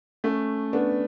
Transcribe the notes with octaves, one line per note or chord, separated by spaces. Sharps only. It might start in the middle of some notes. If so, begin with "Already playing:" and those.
A3 C#4
B3 D4